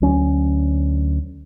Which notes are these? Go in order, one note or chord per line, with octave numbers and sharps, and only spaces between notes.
D2 F#3 C#4